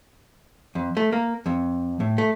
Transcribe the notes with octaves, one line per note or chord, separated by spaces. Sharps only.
F2
A3
A#3
F2
A2
A3